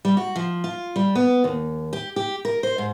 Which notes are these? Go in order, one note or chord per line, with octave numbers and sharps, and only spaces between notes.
G3
F#4
F3
F4
G3
B3
D#2
G4
G4
A#4
C5
G#2